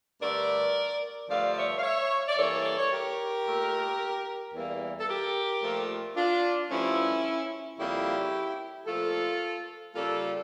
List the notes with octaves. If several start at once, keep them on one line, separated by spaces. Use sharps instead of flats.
G2 D3 A3 A#4 D5
G2 D3 F3 A3 D5 F5
D5
C#5 E5
F5
C#5 E5
D5
G2 E3 A#3 A4 C#5
D5
C#5
G4 A#4
A#2 A3
E2 E3 G3 A#3
A4
G4 A#4
A#2 F3 A3
D4 F4
G2 F3 A3 C#4 E4
F2 C#3 G3 A#3 E4 G4
A#2 F3 A3 F4 A4
C#3 G3 A#3 F4 A4